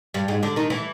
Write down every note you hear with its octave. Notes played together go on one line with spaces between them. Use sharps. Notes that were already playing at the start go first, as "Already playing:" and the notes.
G2 G3
G#2 G#3
D3 D4
D#3 D#4
E3 E4